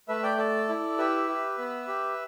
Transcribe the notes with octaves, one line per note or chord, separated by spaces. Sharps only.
A3 B4 E5
D5 G5
A4 D5
E4
G4 B4 E5
G4
B3
G4